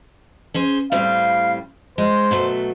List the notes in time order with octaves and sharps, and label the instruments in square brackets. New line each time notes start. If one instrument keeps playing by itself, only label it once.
[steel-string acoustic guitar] C#4 G#4 C5
[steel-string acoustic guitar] A2 G3 C4 [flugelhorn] F5
[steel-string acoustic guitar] G#3 [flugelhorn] C5
[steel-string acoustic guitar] B2 F#3 A3